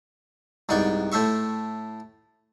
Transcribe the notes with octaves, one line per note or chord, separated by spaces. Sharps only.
C2 G#2 B3 D5 G5 C#6
A2 A3 C5 E5 C#6